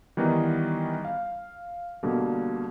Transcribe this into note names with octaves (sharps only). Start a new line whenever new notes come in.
D#3 E3 G3 B3 D#4
F5
B2 D3 G3 A#3